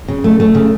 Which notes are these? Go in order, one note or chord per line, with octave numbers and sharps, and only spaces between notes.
C#3
A3
A3
C#3